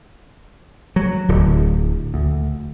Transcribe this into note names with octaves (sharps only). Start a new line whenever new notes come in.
F#3
D1
D2